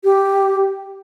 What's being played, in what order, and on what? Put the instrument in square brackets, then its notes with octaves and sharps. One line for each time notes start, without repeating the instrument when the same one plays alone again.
[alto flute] G4